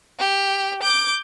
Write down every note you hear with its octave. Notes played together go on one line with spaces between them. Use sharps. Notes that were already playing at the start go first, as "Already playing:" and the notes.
G4
D6 G6